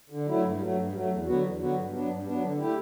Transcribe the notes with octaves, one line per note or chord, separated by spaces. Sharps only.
D3
F#3 A3 E4
G2
F#3 A3
G2
F#3 A3
E2
D3 F#3 B3 F#4
E2
D3 F#3 B3 F#4
G2
F#3 B3 D4
G2
F#3 B3 D4
D3
A3 E4 G4